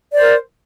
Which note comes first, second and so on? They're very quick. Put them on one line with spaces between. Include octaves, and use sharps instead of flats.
D5 C5 A#4